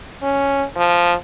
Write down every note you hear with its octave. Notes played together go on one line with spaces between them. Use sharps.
C#4
F3